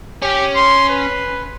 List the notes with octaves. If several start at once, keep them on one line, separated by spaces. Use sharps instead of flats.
C#4 G4
C6
B4